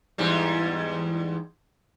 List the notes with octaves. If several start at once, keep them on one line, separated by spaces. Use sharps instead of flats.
E2 G#2 G3